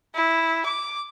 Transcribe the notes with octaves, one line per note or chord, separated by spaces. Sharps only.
E4
D6